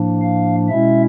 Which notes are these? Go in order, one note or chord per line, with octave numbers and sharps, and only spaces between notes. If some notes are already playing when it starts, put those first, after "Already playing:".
Already playing: A2 F3 A#3 D4
F5
B2 G#3 C#4 E4 E5